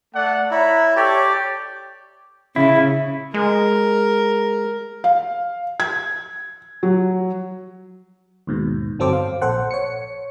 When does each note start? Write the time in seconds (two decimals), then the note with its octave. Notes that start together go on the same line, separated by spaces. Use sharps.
0.14 A3 D5 F#5
0.51 E4 C#5 A#5 B5
0.96 G4 A4 C#5 D5
2.56 C#3 E4
3.34 G#3 A#4
5.04 F5
5.80 G#6
6.83 F#3
8.47 D#2 G#2 B2
8.99 G1 F#3 C4 A4 C5 D6
9.13 F5
9.42 A#1 A4 C5 F#5
9.71 C#5 C#7